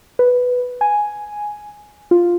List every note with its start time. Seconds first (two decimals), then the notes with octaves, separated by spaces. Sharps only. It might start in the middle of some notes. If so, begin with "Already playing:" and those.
0.19 B4
0.81 G#5
2.11 F4